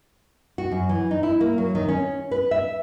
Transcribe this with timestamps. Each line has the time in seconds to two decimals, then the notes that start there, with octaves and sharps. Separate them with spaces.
0.58 F#4
0.72 F#2
0.89 E3
1.11 D#4
1.23 E4
1.41 A#3
1.58 F#3
1.75 D#3
1.88 C#4
2.31 B4
2.51 E5